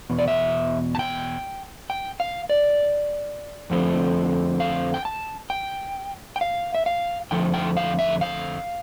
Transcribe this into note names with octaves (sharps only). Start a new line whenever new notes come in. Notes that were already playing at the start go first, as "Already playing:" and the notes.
E2 B2
D5
E5
A5
G5
G5
F5
D5
F2 D3 F3 A3 C4
F5
G5
A5
G5
G5
F5
E5
F5
F2 D3 F3 A3 G5
G5
F5
E5
F5